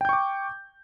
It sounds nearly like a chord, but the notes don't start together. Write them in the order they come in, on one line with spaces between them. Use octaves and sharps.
G5 G6 C#6 D6